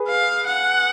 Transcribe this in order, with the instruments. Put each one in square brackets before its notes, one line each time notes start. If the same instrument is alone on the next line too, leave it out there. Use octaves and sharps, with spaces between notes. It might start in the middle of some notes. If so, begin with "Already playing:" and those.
Already playing: [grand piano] G#4 B4
[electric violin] F5
F#5